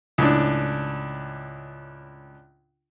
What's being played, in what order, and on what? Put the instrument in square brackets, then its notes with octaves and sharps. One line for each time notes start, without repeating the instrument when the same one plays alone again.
[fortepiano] C#2 A2 D4